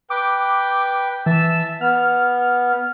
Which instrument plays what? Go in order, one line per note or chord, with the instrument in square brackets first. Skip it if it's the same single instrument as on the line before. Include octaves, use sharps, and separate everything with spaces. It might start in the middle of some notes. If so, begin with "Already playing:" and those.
[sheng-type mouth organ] B4 G5 [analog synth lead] D6
[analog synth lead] E3 [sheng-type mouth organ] E5 A5 E6
[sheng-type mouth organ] B3 [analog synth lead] F6